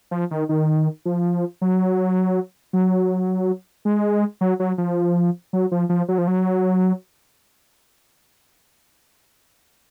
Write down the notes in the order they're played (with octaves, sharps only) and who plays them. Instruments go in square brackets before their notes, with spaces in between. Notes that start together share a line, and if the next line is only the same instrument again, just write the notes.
[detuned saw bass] F3
D#3
D#3
F3
F#3
F#3
G#3
F#3
F#3
F3
F#3
F3
F3
F#3
F3
F#3